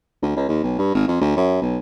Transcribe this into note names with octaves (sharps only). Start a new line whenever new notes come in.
D2
C#2
D#2
B1
G2
G#1
F2
D2
F#2
B1